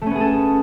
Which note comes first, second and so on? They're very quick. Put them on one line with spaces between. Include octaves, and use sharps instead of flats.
A3 C#4 B3 G#4 A4